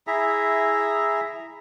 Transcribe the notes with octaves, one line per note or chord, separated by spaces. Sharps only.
E4 G#4 E5 A#5